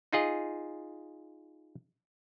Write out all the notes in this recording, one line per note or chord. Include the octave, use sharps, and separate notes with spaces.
D#4 F4 G#4 D#5